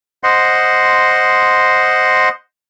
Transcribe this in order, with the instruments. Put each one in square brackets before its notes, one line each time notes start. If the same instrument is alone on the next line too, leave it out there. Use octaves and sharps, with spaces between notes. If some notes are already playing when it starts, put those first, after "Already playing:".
[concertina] C5 D#5 F#5 C6